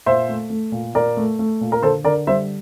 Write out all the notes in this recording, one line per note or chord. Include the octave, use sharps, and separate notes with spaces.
A#2 C5 E5
A3
A3
A#2
A#2 A#4 D5
A3
A3
A#2
A#4
D3 A4 C5
D3 A#4 D5
G3 C5 E5